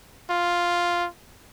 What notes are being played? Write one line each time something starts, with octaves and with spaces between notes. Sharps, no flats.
F4